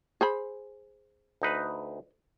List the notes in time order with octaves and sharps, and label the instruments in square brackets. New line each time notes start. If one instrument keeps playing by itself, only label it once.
[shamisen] G#4 C5 B5
[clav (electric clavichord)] D2 D#4 B4